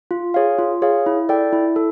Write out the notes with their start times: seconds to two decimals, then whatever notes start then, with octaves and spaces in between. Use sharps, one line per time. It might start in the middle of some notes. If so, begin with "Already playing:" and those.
0.11 F4
0.34 G#4 C#5 F5
0.58 F4
0.82 G#4 C#5 F5
1.06 E4
1.29 A4 D5 G5
1.53 E4
1.76 A4